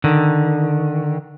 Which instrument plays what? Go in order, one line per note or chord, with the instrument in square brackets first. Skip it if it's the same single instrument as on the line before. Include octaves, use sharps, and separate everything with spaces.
[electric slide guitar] D3 D#3